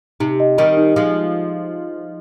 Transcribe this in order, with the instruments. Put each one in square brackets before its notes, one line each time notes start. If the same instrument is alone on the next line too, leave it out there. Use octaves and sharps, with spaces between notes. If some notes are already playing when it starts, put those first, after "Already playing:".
[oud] C3 [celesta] D#4
[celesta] D#5
[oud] D#3 G3 [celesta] D#5
[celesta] D#4
[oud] F3 G#3 [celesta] D#4